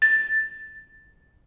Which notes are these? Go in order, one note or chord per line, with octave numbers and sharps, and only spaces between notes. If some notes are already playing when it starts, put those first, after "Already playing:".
A6